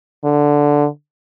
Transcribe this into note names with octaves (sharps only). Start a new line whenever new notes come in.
D3